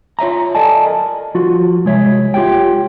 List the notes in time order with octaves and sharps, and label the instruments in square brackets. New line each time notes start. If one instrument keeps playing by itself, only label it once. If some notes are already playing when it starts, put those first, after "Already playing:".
[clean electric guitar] F4 C#5 E5 A#5
A4 D5 D#5 G#5 A5
A#4
F3 F4 F#4
C2 G#3 C#5 E5
F4 G4 C#5 G5